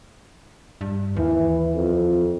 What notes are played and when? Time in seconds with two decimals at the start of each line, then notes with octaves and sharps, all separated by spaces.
0.81 G2
1.16 D#2 E3
1.74 F2